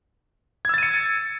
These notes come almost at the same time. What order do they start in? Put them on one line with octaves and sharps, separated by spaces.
G#6 E6 A6 D#7 C#7